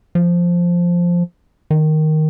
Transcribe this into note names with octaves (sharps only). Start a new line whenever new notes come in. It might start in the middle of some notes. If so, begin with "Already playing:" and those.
F3
D#3